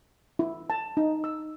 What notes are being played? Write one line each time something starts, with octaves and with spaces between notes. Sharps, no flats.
E4
A5
D#4
E6